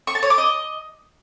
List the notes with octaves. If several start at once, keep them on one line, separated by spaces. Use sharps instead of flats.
C#6
A5
C#5
D6
D#5